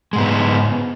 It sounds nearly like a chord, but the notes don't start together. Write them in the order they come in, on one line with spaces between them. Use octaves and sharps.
G#3 G#2 B3